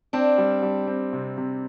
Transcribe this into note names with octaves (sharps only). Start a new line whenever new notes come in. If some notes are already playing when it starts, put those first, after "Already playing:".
C4 D4
G3
G3
C4
C3
C3